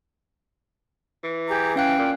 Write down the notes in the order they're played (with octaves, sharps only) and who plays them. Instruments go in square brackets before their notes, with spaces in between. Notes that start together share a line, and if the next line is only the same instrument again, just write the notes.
[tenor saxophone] E3
[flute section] G4 G#4 A#5
[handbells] C#4 F5 F#6 [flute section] G5
[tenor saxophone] A#2